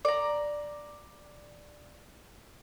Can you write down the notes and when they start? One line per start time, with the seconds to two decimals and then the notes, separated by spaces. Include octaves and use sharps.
0.05 D5 A#5